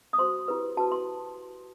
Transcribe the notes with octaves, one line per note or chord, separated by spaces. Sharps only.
D#6
F#4 C5 C6
E4 G4 B4
F#4 B4 A5
C6